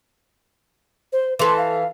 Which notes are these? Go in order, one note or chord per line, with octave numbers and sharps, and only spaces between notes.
C5
E3 A4 C6
F5